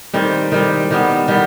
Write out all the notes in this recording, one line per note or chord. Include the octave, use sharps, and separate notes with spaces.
D#3 G3 C4
D#3 G3 C4
D#3 G3 B3
D#3 G3 B3